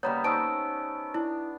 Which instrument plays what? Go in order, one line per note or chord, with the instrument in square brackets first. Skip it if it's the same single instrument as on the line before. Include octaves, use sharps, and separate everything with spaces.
[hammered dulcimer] C#3 G3 B3 [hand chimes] A#3 A#5 G6 [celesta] C#5
[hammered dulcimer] C#4 D#4 [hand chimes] C5 C#6 E6 [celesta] A5 D7
[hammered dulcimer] D4 [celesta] E4